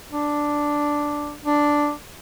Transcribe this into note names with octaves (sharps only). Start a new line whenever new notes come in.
D4
D4